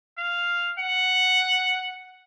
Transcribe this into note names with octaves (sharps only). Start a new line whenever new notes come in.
F5
F#5